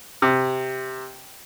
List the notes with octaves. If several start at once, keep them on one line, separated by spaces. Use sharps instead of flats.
C3